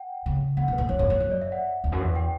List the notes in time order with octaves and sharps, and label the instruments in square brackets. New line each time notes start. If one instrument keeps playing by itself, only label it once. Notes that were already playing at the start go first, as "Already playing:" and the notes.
Already playing: [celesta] F#5 G5
[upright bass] C#3
[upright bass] C#3 [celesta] F#5
[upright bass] B2
[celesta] B4
[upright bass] A2
[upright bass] G2 [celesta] C#5
[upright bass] F#2 [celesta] C#5
[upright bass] G2 [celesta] C#5
[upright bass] F#2 [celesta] C#5
[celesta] D5
E5
F#5
[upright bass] E2
F#2
E2
[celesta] G5